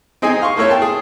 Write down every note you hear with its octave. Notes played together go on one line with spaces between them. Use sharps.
C4 D#4 G#4 G#5
F5 C6 C#6
A3 A#3 E4 C#5
G5 A5 C6
G#4